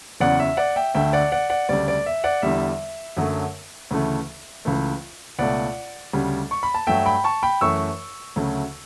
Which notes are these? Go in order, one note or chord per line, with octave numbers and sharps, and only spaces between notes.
E2 C#3 F#3 D5 F#5
E5
D5 F#5
E5 G5
D2 D3 A3 E5 G5
D5 F#5
D5 F#5
D5 F#5
D2 C#3 G3 D5
D5
E5
D5 F#5
E2 D3 G3 E5
F#2 D3 F#3 A3
D2 C#3 E3 A3
C#2 C#3 E3 A3
C#2 B2 A3 D5 F#5
D2 C#3 G3
C#6
B5
A5
G2 F#3 A3 E5 G5
G5 B5
A5 C#6
G5 B5
F#2 E3 A3 C#6 E6
D2 C#3 F#3 A3